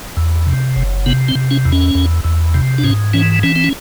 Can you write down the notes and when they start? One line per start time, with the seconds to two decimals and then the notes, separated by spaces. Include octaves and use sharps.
0.17 E2
0.47 C3
0.76 F#1
1.06 C3 B3
1.29 C4
1.35 C3
1.51 C#4
1.65 E2
1.72 C#4
1.95 E2
2.24 E2
2.54 C3
2.78 D4
2.84 G#2 C#4
3.13 E3 C#4
3.43 E3 C#4
3.56 C4
3.64 C#4